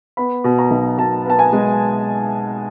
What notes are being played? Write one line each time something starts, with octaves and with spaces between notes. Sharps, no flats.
B3 B5
B2
A#5
B1
B2 A5
B3 A5
G#5
G#3